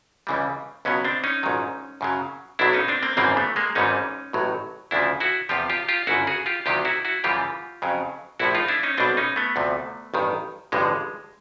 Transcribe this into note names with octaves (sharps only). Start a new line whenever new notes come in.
C#2 C#3 E3 G3
C#2 B2 F#3 B3 C#4
C4 D4
C#4 D#4
A#1 G#2 D#3 F#3
F#2 C#3 F#3
B1 B2 F#3 D4 E4
C#4 D#4
C4 D4
A#3 C4
G#1 F#2 C#3 E3 G3 A#3 C4
A3 B3
G#3 A#3
G#1 G#2 E3 G3 C#4 D#4
A1 A2 F#3
D2 C#3 F3 D4 E4
E4 F#4
E2 C3 F3 F4 G4
F4 G4
F4 G4
G1 F#2 C#3 E4 F#4
F#4 G#4
F4 G4
D2 C3 D#3 F#3 F4 G4
E4 F#4
E4 F#4
F#2 C#3 E3 G3 F4 G4
F2 C#3 F#3
A#1 A2 F3 E4 F#4
D#4 F4
D4 E4
C#4 D#4
B1 B2 G3 C4 D4
C#4 D#4
A3 B3
D2 C3 F3
A1 G2 D#3
A1 G2 D3 F3 G#3